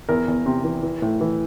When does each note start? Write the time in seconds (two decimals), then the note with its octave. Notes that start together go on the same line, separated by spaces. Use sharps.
0.09 E2 A#4
0.28 E2
0.46 C3
0.64 E3
0.83 E3
1.02 A2
1.21 E3